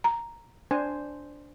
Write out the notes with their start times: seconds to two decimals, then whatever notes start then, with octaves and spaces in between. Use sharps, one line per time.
0.04 A#5
0.71 D4 C5 G#5